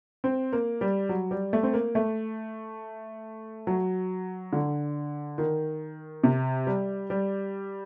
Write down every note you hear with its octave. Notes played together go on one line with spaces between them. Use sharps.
C4
A#3
G3
F#3
G3
A3
C4
A#3
A3
F#3
D3
D#3
C3
G3
G3